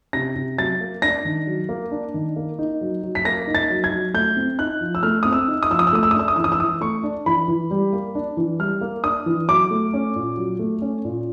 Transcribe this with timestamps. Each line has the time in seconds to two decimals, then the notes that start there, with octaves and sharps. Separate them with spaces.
0.13 C3 A#6
0.36 C3
0.57 F#3 A6
0.81 A#3
1.02 D4 A#6
1.25 D#3
1.47 F#3
1.69 A#3
1.91 D4
2.14 D#3
2.36 A#3
2.59 D#4
2.81 F#3
3.03 F#3
3.15 B6
3.25 A#3 A#6
3.47 D#4
3.55 A6
3.70 F#3
3.84 G#6
3.92 F#3
4.14 A3 G6
4.36 C4
4.58 D#4 F#6
4.81 F3
4.95 E6
5.03 A3 F6
5.23 C4 D#6
5.33 E6
5.48 D#4
5.63 D#6
5.70 F3 E6
5.79 D#6
5.87 E6
5.93 A3 D#6
6.03 E6
6.11 D#6
6.14 D4
6.19 E6
6.28 D#6
6.36 E3 E6
6.44 D#6
6.52 E6
6.59 E3 D#6
6.81 A3 C#6
7.03 D4
7.26 E3 B5
7.48 E3
7.71 G3
7.93 A#3
8.15 D4
8.37 E3
8.59 G3 F6
8.81 A#3
9.04 D4 D#6
9.26 E3
9.48 F#3 D6
9.71 A3
9.94 C#4
10.16 A#2
10.37 F#3
10.59 A3
10.82 C#4
11.04 A#2